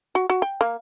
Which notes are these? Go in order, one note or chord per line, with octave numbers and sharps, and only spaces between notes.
F#4
F#4
G5
A#3